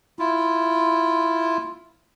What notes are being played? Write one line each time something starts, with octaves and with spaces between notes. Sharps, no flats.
E4 F4